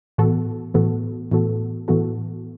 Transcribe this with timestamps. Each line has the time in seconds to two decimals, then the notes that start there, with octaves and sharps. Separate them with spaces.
0.18 A2 E3 B3 F#4 A4
0.74 A2 E3 B3 F#4 A4
1.32 A2 E3 B3 F#4 A4
1.88 A2 E3 B3 F#4 A4